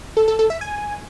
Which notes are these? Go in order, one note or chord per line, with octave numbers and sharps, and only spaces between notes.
A4
A4
A4
E5
G#5